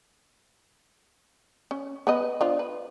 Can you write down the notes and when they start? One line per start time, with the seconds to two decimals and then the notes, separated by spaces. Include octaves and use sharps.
1.71 C#4
2.07 B3 B4 D#5
2.41 D4 F4 C5
2.59 B4